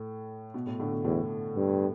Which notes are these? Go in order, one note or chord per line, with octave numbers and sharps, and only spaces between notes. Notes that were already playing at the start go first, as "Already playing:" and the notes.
Already playing: A2
B2
A2
A2 D3
B2
E2 A2
G2